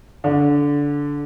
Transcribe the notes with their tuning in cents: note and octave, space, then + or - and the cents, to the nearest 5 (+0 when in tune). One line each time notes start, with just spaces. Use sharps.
D3 -20